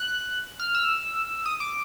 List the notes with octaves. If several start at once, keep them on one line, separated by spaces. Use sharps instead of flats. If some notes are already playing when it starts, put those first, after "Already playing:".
Already playing: F#6
F6
E6
D#6
D6